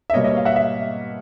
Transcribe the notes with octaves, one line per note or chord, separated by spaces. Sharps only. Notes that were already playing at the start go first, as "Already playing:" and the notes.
E5
B2 G3 A#3 C#5 D#5
C#5 D#5
F5
E5 F#5
E5